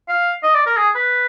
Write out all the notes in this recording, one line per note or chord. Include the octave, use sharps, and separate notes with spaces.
F5
D#5
D5
A#4
G#4
B4